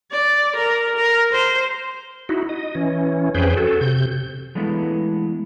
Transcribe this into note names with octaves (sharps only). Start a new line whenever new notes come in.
D5
A#4
A#4
C5
D#4 E4 F#4
D#5
E3 C#4
F2 C#4 G#4 B4 C5 G5
F#4 A4
C3 G6
E3 G#3 A3 B3 D4 E4